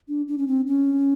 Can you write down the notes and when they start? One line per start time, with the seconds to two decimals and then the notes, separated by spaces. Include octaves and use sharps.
0.08 D4
0.28 D4
0.38 C#4
0.48 C4
0.67 C#4